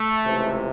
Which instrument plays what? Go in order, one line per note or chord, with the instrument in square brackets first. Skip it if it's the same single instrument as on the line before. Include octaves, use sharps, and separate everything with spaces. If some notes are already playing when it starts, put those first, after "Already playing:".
Already playing: [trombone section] A3
C#2 C3 E3